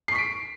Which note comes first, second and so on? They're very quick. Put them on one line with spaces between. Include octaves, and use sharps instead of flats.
C7 C#6 B6 D7